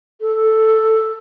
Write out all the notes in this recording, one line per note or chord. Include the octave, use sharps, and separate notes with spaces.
A4